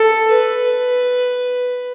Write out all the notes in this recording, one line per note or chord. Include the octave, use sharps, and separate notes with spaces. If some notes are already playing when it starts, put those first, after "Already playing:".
Already playing: A4
B4